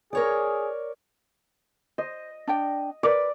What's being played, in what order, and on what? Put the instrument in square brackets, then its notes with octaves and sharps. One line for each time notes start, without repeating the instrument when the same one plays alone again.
[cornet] G#4 [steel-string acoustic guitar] A#4 C#5 D5
[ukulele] C5 [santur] D#5
[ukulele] D4 D5 G5
[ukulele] A#4 B4 [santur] D5